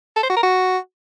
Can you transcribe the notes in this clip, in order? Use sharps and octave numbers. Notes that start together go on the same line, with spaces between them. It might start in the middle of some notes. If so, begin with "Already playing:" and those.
A4
C5
F#4
A#4
F#4